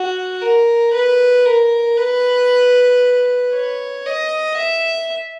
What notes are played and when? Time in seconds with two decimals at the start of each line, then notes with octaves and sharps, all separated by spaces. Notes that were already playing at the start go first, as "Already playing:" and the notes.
Already playing: F#4
0.42 A#4
0.93 B4
1.46 A#4
1.98 B4
3.54 C#5
4.06 D#5
4.57 E5